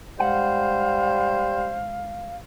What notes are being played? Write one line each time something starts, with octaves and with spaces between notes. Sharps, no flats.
G#2 G3 C5 F5 F#5